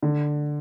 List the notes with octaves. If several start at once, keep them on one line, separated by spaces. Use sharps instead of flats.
D3